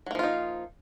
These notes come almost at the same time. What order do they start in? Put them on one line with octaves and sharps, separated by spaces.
F#3 A#3 F3 F4 D#4